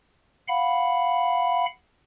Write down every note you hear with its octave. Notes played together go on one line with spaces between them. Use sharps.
F5 F#5 B5